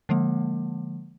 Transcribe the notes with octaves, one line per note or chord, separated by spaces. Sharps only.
D3 F3 G#3 A#3